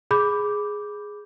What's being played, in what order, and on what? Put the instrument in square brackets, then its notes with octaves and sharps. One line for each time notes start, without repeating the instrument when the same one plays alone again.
[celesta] G#4 B5 D6 G6